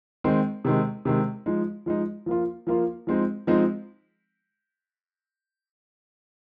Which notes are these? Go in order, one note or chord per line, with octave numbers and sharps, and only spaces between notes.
D#3 G#3 C4
C3 D#3 G#3
C3 D#3 G#3
F3 G#3 D#4
F3 G#3 D#4
F3 A#3 F4
F3 A#3 F4
F3 G#3 C4 D#4
F3 G#3 C4 D#4